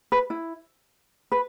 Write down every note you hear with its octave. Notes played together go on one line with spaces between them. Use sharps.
B4
E4
B4